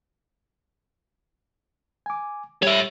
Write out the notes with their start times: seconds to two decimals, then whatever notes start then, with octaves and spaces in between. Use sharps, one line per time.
2.06 G#5 D6
2.63 G3 C#5 E5